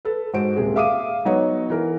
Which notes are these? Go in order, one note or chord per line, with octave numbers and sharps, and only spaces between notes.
A4 B4
G#2 F#4 C5 D7
D#1 C3 G#3 G#4
E5 F5 D6 D#6 D#7
F#3 B3 D#4 F#4 C#5
E3 A#4